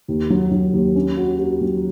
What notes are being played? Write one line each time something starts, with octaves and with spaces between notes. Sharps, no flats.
D#2
F#3
F#3
D#2
C#4
F#4
F#4
F#3